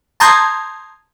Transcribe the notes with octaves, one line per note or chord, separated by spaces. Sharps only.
A5 A#5 C6 D#6 G6 G#6